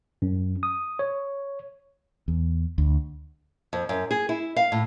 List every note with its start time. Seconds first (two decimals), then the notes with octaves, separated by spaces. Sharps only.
0.22 F#2
0.63 D#6
0.99 C#5
2.28 E2
2.78 D2
3.73 F2
3.89 F#2
4.11 G#4
4.29 E4
4.56 F5
4.72 A2